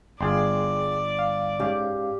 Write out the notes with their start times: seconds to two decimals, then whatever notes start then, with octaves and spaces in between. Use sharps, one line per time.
0.21 G1 F4 G#4 D5 G5 C6
1.19 F5
1.60 G#2 C#4 G4 F5